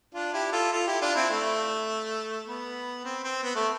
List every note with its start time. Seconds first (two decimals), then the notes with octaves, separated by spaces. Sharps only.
0.14 D4 F4
0.33 E4 G4
0.52 F4 A4
0.72 F4 A4
0.87 E4 G4
1.01 D4 F4
1.15 C4 E4
1.30 A3
2.46 B3
3.05 C4
3.24 C4
3.43 B3
3.56 A3